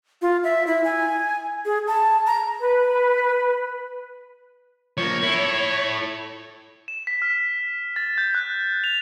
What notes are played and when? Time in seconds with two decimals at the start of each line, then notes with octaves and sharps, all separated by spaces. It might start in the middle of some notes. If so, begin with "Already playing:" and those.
0.22 F4
0.44 E5
0.67 E4
0.84 G#5
1.65 G#4
1.87 A5
2.27 A#5
2.60 B4
4.98 F3 A#3 C#5
5.23 E4 A4
6.88 E7
7.07 B6
7.22 F6
7.96 A6
8.18 G6
8.35 F#6
8.84 F7